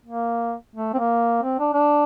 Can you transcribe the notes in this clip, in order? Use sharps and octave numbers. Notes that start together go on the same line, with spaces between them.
A#3
A3
C4
A#3
C4
D4
D4